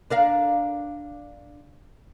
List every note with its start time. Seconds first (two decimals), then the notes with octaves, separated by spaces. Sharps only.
0.10 D4 A#4 F5